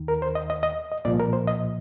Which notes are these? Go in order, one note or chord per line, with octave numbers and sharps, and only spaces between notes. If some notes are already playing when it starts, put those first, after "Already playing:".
Already playing: D#2 D#3
A#4
C5
D#5
D#5
D#5
D#5
C2 A#2 F3 D5
A#4
C5
D#5